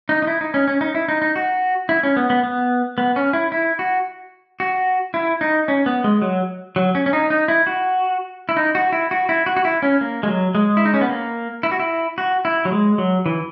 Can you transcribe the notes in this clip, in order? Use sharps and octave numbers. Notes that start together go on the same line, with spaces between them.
D#4
D#4
E4
D#4
C#4
C#4
D#4
E4
D#4
D#4
F#4
E4
C#4
B3
B3
B3
B3
C#4
E4
E4
F#4
F#4
E4
D#4
C#4
B3
G#3
F#3
F#3
C#4
C#4
D#4
D#4
E4
F#4
E4
D#4
F#4
E4
F#4
E4
F#4
F#4
E4
C#4
A#3
G#3
F#3
G#3
E4
D#4
C#4
B3
A#3
E4
F#4
E4
F#4
E4
F#3
G#3
F#3
E3